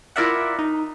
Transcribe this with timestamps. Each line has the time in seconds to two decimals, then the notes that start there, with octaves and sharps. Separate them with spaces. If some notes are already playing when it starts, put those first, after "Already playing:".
0.16 E4 F4 A#4 D5 E5 F#5
0.59 D#4